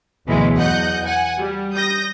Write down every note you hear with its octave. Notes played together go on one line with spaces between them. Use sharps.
D2 B2 E3 F#3 G#3
E2 D#5 F#5 F#6 G6
F#5 G#5
G3
D#6 G6 A#6